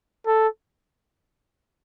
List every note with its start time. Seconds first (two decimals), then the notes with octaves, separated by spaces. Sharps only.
0.27 A4